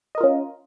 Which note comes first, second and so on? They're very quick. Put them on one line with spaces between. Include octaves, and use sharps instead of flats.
D#5 A#4 F4 C#4